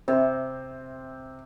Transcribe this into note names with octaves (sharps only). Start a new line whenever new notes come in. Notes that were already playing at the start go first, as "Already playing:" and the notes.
C3 C4